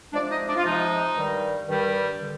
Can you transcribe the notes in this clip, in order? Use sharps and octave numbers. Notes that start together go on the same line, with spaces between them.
C3 F3 G#3 D4 D5
D#4 D#5
D4 D5
F4
C3 F3 G#3 D#4
G2 D#3 G3
G2 D#3 G3
D3